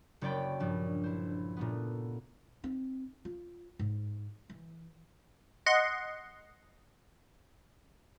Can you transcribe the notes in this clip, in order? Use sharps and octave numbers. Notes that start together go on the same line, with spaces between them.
F#1 C#5 D5 G5 B5
A#1 G2
E4 C5
A#2 A3 B3
C4 D#4
F4
G#2
E3
D#5 F#5 C6